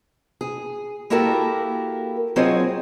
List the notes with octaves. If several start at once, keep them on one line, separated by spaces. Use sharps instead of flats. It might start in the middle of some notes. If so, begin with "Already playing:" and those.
G#4
A#3 E4 F#4 G4 A4 A#4
F#3 C4 F4 G#4 C#5 D#5